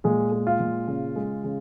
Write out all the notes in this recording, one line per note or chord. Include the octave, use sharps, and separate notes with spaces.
A#2 G#3 G#4
G#3
F4
A#2
C#3
G#3
C#3